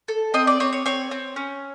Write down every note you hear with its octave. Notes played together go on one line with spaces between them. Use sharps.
A4
C4 D#5
D5
C4 C#5
C#5
C4 C#5
C4
C#4